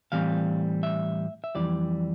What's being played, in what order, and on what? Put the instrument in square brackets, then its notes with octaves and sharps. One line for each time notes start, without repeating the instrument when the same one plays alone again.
[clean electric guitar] A2 E3 G3 C4 F5
E5
E5
F2 E3 G3 D5